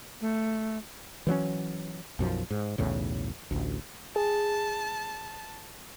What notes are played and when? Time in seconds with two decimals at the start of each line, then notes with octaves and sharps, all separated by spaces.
0.21 A3
1.27 E3 F#3 A#3 C#4
2.19 B1 F#2 F3
2.51 G#2
2.78 B1 E2 A2 C#3
3.51 A1 D2
4.16 G#4 A5